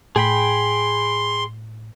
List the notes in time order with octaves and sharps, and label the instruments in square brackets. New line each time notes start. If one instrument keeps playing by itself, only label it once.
[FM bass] A2 [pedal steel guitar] G#4 G5 B5 [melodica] C6